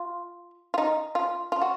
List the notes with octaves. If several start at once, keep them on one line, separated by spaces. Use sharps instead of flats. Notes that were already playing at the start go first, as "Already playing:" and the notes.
Already playing: F4
F4
D#4
F4
F4
F#4